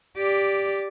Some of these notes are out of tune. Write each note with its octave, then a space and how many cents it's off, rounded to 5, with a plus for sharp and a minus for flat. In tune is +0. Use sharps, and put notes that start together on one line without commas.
G4 +5 D5 -5